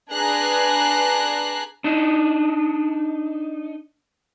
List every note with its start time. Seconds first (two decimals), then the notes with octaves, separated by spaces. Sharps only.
0.11 D4 G#4 B4 A#5 F#6 C7
1.84 D4 D#4